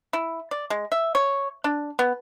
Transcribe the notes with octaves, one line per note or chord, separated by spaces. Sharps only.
E4
D5
G#3
E5
C#5
D4
B3